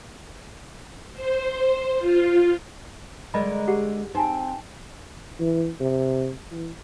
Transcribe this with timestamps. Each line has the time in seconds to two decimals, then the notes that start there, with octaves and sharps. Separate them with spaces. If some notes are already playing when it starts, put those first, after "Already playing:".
1.14 C5
1.99 F4
3.34 D3 G#3 A#4 D5 D#5 B5
3.68 G4 G#4 F#5
4.15 C4 D#4 G#5 A5
5.40 E3
5.80 C3
6.51 E3